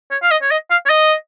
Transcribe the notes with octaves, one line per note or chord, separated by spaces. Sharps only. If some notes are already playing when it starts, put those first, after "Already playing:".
C#5
F5
D#5
C#5
D#5
F5
C#5
D#5